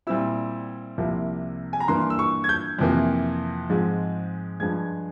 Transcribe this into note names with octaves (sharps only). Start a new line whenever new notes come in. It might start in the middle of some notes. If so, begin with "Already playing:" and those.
A#2 G3 C4 E4 E6
C2 C3 F3 A#3 E4
G#5
A#5
G2 E3 A#3 C6
E6
C#6
G#6
G6
F2 C3 E3 A#3
G#2 F3 G#3 C4
G2 F3 G#3 G#6